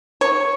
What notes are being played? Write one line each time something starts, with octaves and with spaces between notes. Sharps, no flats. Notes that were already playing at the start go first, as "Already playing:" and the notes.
C#5